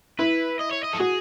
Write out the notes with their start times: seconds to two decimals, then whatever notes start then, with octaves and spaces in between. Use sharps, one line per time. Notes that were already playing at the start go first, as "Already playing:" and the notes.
0.19 E4 B4
0.59 D#5
0.71 C#5
0.83 D#5
0.93 A4
1.00 F#4 G#4